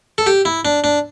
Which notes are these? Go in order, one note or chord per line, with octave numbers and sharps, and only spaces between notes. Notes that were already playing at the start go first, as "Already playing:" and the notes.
A4
G4
E4
D4
D4